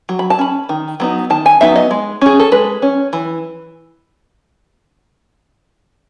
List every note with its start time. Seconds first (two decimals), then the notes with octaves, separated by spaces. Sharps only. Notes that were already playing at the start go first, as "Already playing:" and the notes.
0.09 F#3
0.19 B5
0.30 A5
0.39 C#4 B5
0.69 D#3
1.00 F#3 B3 D#4
1.30 D#3 A5
1.46 G#5
1.61 F#3 B3 D#4 E5
1.76 D#5
1.91 G#3
2.21 C#4 G#4
2.40 A4
2.52 G#3 B4
2.82 C#4
3.13 E3